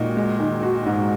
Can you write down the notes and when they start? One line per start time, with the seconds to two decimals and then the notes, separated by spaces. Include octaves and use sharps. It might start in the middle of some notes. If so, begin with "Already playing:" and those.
Already playing: A#2 D#3 G#3 F#4 D#5
0.17 G#3
0.39 D#3
0.62 F#4
0.86 G#2 D#5